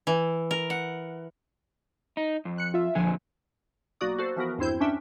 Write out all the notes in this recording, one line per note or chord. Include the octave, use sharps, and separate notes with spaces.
E3
A#4
F#5
D#4
F2
F#6 C#7
F4 E5
A#1 F2 D3 F3 G#5
B1 A#3 F#4 D5 D#6
F#4 A4 C5
E3 F3 B3 F#4 A#4
E2 G2 C4 E4 C5 G6
C#4 D4 E5 G5